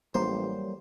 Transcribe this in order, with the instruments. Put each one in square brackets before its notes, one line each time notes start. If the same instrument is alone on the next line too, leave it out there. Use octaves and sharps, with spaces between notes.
[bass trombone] A1 [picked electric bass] F#3 G3 A#3 [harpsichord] C5